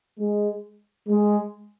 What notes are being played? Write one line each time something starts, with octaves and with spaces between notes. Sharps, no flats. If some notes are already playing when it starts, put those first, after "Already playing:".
G#3
G#3